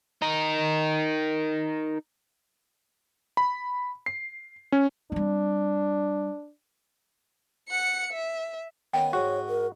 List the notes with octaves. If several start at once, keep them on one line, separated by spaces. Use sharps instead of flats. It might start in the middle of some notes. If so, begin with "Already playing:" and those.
D#4 A#4
B5
C7
C#4
G3 C4 D4
F#5 C#7
E5
D#3 B3 C#4 G5
G#2 G#3 F#4 C#5
A#4